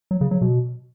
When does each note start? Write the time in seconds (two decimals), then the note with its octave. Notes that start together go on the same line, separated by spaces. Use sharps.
0.11 F#3
0.21 C#3
0.31 F#3
0.41 B2